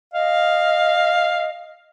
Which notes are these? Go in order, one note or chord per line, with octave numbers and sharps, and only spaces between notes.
D#5 F5